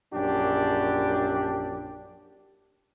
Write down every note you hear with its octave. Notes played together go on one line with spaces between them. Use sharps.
A#1 F#2 D4 G4